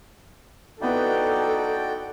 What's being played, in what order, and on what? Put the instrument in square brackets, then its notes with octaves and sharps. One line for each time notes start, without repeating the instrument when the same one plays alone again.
[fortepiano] B3 E4 [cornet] D#4 [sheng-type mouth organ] F#4 D5 G5 [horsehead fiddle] A4